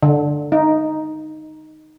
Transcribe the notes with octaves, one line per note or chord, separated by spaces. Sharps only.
D3
D#4